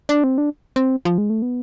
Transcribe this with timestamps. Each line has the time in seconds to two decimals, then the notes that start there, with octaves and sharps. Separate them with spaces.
0.09 D4
0.24 C4
0.38 D4
0.76 C4
1.05 F3
1.18 G#3
1.30 A3
1.42 B3